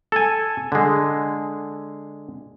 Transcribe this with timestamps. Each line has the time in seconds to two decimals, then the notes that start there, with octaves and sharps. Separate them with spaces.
0.12 A4 G#5
0.72 D3 G#3